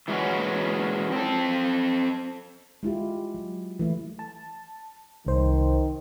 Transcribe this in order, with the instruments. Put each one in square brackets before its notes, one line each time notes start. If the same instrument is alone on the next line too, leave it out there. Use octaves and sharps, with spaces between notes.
[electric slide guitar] E3 G#3 A3 C#4 F#4
C4 A4
[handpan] G#3 E4 F4 G4
F#3
E3 A3 E4
[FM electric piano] A5
[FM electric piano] C2 C5 [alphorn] D#3